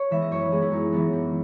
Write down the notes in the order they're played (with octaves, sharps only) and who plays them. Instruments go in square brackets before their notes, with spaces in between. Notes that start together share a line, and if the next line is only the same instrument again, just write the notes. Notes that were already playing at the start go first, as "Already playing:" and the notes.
Already playing: [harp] C#5
E3 G#3 B3 E5
D#5
F#2 C#5
B4
E3 G#3 B3 G#4
E4
F#2 D#4
E3 G#3 B3
F#2